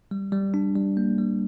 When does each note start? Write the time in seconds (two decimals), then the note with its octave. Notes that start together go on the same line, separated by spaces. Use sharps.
0.11 G3
0.32 G3
0.54 D4
0.76 G3
0.97 A#3
1.18 G3